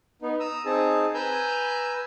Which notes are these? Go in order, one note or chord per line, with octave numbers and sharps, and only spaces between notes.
B3 D#4
A#5 D#6 E6
C4 D#4 G#4 A5
B4 G#5 A#5 E6 G6